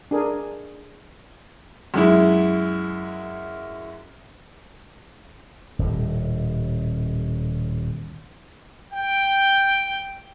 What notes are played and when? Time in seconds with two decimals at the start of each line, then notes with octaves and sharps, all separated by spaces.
0.11 D4 G#4 A#4
1.94 F#2 G#3 E4
5.79 D#1 A2
8.93 G5